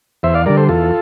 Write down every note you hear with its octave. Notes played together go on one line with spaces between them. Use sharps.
E2 C5 E5
D5 F5
D3 G3 A#4 D5
A4 C5
E2 F4 A4